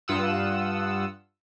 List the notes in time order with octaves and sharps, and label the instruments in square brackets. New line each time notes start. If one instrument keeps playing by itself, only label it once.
[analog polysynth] G2 F4 F#5 D#6 E6